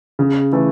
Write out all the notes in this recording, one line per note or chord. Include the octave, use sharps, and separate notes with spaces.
C#3
E3 A3